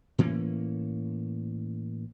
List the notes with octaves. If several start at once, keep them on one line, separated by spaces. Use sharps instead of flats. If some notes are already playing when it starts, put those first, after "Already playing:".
A2 E3 A#3 C#4